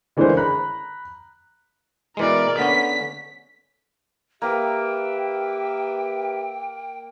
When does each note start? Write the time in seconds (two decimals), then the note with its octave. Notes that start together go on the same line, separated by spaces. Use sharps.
0.17 D3 E3 G#3 C#4 A#4 C5
0.37 A#5 B5 F#6
2.17 B2 E3 G#3 A#4 D5
2.58 D3 B3 C#4 B6
4.42 A#3 G4 B4 E5 G5